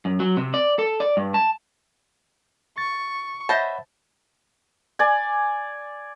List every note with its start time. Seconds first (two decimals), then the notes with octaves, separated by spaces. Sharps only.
0.05 F#2
0.20 F#3
0.37 C3
0.54 D5
0.79 A4
1.00 D5
1.17 G2
1.34 A5
2.78 C#6 A6
3.49 C5 C#5 D#5 E5 F#5 A5 B5
4.99 D5 G#5